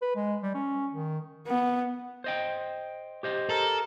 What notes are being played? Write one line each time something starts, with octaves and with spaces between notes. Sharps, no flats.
B4
G#3
G3
C#4
D#3
B3
C5 D#5 G5
G4 C5 D#5
A4 A#4